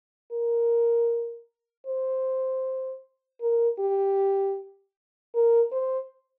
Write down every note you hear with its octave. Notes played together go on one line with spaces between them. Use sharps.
A#4
C5
A#4
G4
A#4
C5